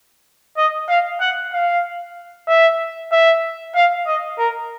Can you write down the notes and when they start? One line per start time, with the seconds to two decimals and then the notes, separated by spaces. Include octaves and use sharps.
0.58 D#5
0.89 F5
1.21 F#5
1.53 F5
2.48 E5
3.12 E5
3.75 F5
4.07 D#5
4.39 A#4